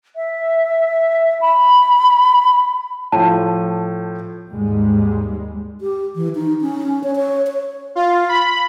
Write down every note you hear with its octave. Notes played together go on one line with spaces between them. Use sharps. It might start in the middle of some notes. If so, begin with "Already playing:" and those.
E5
B5
A2 F3 A5
D#2 G#2 G3 G#3
G4
E3
D#4
C#4
C#5
C#5
C#5
F4
B5